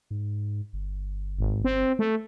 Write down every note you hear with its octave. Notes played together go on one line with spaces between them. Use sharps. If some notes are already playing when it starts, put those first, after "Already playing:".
G#2
G1
G#1
C4
A3